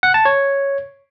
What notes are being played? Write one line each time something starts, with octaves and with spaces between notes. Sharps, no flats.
F#5
A5
C#5